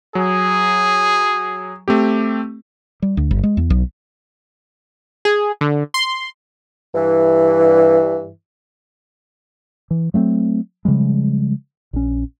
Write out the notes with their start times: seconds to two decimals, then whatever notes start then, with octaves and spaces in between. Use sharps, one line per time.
0.15 F#3 G#4
1.88 A3 C4 G4
3.02 G3
3.17 D2
3.31 G1
3.43 G#3
3.57 E2
3.70 B1
5.25 G#4
5.61 D3
5.94 C6
6.94 G2 E3
9.91 E3
10.14 F#3 A3 A#3 C4
10.85 C#3 F3 G3 G#3
11.93 A#1 C#4